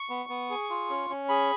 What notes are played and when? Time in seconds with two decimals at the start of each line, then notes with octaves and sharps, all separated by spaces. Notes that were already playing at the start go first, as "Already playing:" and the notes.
Already playing: C#6
0.09 B3
0.29 B3
0.50 G#4
0.70 F4
0.90 C#4
1.10 C#4
1.29 G#4 B5